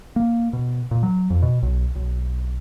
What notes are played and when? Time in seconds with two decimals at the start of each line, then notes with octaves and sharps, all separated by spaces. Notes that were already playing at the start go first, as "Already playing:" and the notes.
0.16 A#3
0.53 B2
0.91 A#2
1.03 F#3
1.30 F2
1.42 B2
1.62 B1
1.95 B1